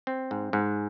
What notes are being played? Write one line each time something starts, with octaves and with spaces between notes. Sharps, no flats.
C4
G#2
G#2